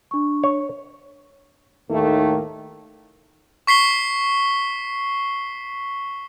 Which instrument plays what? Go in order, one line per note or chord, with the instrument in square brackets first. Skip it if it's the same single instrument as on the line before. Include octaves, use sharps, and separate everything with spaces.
[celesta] D4 C#6
[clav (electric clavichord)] C#5
[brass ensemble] D#2 A2 D#3 A3 A#3
[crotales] C#6 B6 C7 G7